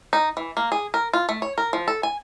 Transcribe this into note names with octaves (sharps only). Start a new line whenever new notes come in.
D#4
E3
A#3
G#4
A#4
F4
A3
C#5
A#4
F3
A4
G#5